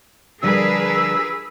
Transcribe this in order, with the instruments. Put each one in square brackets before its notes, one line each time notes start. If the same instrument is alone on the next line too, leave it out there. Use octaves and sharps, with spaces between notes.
[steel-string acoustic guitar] D3 F3 G3 [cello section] G#4 A#4 B4 [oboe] E6